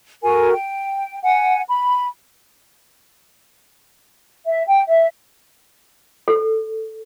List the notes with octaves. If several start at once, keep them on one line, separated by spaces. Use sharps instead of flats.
F#4 A4 A#4 G#5
G5
F#5 G#5
B5
E5
G5
E5
A4